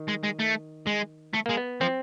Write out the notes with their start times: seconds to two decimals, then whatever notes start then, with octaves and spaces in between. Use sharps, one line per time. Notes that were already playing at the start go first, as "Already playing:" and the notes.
Already playing: D#3
0.08 G#3
0.24 G#3
0.39 A3
0.87 G#3
1.34 A3
1.46 G#3 A#3
1.57 B3
1.81 F3 C4